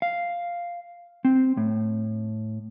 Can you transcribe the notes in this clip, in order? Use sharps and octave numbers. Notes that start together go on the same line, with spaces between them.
F5
C4
A2